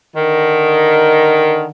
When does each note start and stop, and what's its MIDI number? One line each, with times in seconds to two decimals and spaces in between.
0.16 1.67 50
0.16 1.67 51